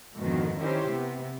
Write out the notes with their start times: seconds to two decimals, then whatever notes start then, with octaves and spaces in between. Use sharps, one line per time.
0.16 F2 G#2 B2 D3 D#3
0.59 D#3 C#4 E4 G4 C5
0.89 C3 B3